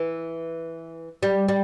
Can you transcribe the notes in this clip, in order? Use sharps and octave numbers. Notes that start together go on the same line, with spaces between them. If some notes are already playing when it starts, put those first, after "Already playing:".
Already playing: E3
G3
G3